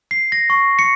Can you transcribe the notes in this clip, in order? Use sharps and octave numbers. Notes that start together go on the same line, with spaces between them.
C7
A#6
C#6
C#7